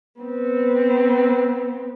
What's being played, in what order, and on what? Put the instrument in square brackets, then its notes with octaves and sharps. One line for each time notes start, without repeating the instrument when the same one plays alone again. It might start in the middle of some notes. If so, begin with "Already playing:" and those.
[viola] B3 C4